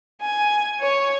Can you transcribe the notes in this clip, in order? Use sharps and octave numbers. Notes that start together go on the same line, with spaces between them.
G#5
C#5